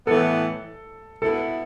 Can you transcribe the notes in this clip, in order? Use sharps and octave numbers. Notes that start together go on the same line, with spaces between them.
A2 E3 B3 A4
B2 B3 E4 A4